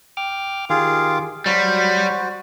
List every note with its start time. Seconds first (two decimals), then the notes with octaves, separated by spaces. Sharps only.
0.17 G5 D6 F6
0.70 D#3 F4 G4 G#4 F5 D6
1.46 F#3 G3 F#4 C5